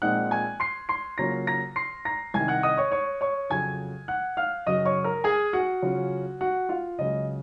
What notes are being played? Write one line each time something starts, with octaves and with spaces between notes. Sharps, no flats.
A#2 F3 G#3 C4 D#4 F#5 F#6
G#5 G#6
C6 C7
C6 C7
C#3 F#3 A#3 C#4 F4 A#5 A#6
A#5 A#6
C6 C7
A#5 A#6
C2 C3 D#3 G#5 G#6
F#5 F#6
D#5 D#6
C#5 C#6
C#5 C#6
C#5 C#6
F2 C#3 F#3 G#5 G#6
F#5 F#6
F5 F6
F#2 C#3 F#3 C#4 D#5 D#6
C#5 C#6
A#4 A#5
G#4 G#5
F#4 F#5
C#3 F#3 C#4 F4
F#4 F#5
F4 F5
C#2 C#3 F#3 D#5